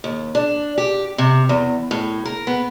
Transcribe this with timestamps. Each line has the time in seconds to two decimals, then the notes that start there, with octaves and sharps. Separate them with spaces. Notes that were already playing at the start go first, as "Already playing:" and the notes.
0.04 D#2
0.35 D4
0.78 G4
1.18 C3
1.49 E2
1.91 A2
2.25 A#4
2.47 B3